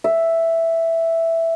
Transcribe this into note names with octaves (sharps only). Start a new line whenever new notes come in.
E5